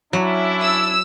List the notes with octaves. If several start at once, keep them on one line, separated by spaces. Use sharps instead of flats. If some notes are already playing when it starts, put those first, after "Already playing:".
F#3 C#4 D4 E4
E6